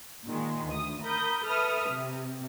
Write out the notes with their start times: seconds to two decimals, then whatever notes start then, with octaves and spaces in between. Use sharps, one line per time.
0.25 A#2 D#3 G#3
0.68 D2 D#6
1.02 A#4 B5 D#6 G6
1.46 A4 B4 E5 B5 D#6 F6
1.90 C3